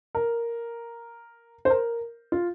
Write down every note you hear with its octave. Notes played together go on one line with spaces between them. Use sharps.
A#4
C5
A#4
F4